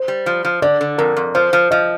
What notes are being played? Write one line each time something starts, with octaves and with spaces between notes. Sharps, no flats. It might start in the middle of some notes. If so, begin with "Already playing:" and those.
Already playing: C5
G3
F3
F3
D3 D5
D3
F2 A#4
F2
F3 C5
F3
F3 D#5